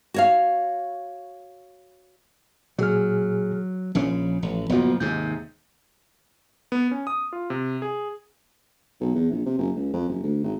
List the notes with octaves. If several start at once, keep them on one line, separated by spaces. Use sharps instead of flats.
F#4 C#5 F5
A#2 F#3 G#4 F6
A#1 C#3 F3 C#4
A1
F#1 A#2 F3 B3 F#4
D#2 G#2 C3 G6
B3
C#4
D#6
F4
C3
G#4
B1
E2
A#1
C3
F#1
C#2
F2
F#1
D2
G#1